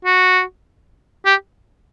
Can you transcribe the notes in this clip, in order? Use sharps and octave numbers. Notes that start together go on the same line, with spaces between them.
F#4
G4